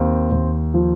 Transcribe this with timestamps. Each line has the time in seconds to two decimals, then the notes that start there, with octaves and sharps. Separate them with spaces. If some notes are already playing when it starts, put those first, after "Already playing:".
Already playing: D#2 C4
0.31 D#2
0.74 F3